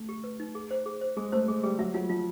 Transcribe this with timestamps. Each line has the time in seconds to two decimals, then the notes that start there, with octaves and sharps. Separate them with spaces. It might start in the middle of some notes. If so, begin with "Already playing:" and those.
Already playing: A3
0.09 G4
0.24 B4
0.40 D#4
0.55 G#4
0.71 C5
0.86 G#4
1.01 C5
1.17 G#3 G#4
1.32 A3 C5
1.48 G#3 G#4
1.63 G3 G#4
1.79 F#3 E5
1.94 F#3 F4
2.10 F3 F4